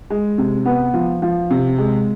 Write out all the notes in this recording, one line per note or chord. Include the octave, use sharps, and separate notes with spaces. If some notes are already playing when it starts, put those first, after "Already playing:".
G#3
C3
B3
F3
F3
C3
G#3